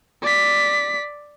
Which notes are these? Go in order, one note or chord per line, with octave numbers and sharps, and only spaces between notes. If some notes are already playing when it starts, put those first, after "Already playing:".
D5 B6